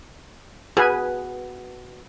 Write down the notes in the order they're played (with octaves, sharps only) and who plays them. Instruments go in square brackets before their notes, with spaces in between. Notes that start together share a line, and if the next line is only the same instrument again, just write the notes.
[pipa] B2 [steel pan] G#4 B4 G#5